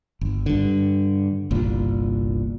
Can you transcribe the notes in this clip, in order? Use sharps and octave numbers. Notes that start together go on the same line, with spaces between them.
G1
G2 D3
G1 C2 A#2